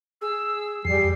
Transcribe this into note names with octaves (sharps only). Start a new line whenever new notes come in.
G#4 E6
F2 G3 G#4 C7